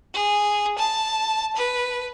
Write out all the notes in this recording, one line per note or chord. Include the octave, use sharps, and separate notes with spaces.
G#4
A5
B4